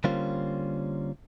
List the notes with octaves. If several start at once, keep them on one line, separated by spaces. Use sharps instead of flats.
D3 G3 A#3 C#4 F4 C5